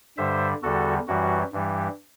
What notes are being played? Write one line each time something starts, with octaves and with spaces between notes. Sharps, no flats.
G2 D3 G3 C5 E5
E2 D3 G3 F#4 A4
F#2 E3 G3 F#4
G2 E3 G3